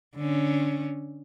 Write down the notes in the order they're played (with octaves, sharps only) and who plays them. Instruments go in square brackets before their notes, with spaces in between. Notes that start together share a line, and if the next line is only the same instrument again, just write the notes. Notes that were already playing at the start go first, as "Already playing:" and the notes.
[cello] D3 C#4